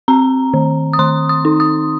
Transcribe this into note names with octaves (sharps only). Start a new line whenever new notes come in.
C4 A#5
D#3
D#6
D#3 C6
D#6
D#4
D#6